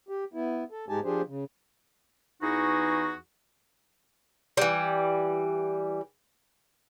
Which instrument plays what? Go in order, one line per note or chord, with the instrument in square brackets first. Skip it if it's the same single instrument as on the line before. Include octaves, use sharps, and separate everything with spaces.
[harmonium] G4
B3 E4
A4
G#2 G#3 D#4 G4 G#5 A5
F3 D4 G4 G#4 C5
C#3
[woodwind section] E2 E3 D#4 F#4 G#4 C#6
[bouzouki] E3 G3